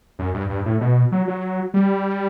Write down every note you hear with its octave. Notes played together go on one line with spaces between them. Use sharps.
F#2
G2
G2
A2
B2
F#3
F#3
G3